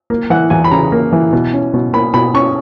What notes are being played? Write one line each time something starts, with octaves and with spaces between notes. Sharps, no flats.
A#3
E3 F#5
E2 G#5
B5
C#3 A#5
A#3
E3
B2
C#4
B2
A#3 B5
B2 B5
C#4 C#6